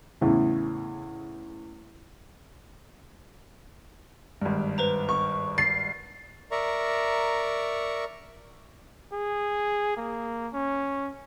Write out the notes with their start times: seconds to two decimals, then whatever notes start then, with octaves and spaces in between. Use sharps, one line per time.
0.21 E2 A2 C#3
4.42 G#1 G2
4.78 B4 C5 A#5
5.09 C#6
5.58 A6 C7
6.51 A#4 D5 E5 A#5 C#6
9.13 G#4
9.97 A#3
10.54 C#4